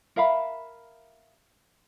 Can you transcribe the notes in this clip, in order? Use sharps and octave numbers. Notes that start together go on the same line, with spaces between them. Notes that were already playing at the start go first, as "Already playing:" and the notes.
A#4 E5 F5 B5